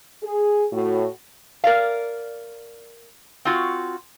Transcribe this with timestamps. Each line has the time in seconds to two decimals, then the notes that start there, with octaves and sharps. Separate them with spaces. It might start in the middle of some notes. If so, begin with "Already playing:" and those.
0.23 G#4
0.73 A2 F#4
1.64 A#4 D5 F5
3.45 C4 F4 F#4